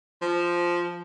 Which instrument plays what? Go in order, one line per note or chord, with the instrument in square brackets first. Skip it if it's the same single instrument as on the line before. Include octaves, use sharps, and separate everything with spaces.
[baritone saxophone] F3